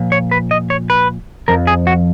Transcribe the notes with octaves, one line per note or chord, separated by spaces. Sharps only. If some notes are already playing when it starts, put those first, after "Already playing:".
Already playing: A#2 F3
C#5
B4
D#5
C#5
B4
F2 F3 A#4
G#4
F#4